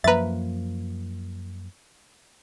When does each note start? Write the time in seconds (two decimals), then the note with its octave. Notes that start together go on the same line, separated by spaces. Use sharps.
0.04 F#2 F3 A#3 B4 E5 A#5 A6